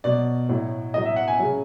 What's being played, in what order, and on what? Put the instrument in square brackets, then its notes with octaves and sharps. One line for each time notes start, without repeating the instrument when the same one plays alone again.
[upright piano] B2 F#3 D5
A2 F#3
A2 D#5
F#3
E5
F#5
G#5
C#3 F#3